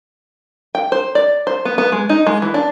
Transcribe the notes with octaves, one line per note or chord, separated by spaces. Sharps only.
G5
C5
D5
C5
B3
B3
G#3
D#4
G#3
E3
D4